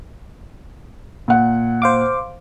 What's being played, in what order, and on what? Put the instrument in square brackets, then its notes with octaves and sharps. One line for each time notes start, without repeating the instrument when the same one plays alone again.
[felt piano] A#2 F#5
[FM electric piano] C5 F5 D6